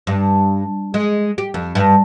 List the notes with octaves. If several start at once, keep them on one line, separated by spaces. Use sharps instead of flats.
G2
G#3
G4
F2
G2